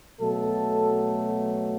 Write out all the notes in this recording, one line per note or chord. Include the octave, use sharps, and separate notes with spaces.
B2 F#3 A3 A4